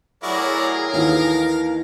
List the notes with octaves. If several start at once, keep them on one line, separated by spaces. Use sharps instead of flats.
A2 F#3 E4 F#4 G#4 A#4 D5
D#2 D#3 E3 F5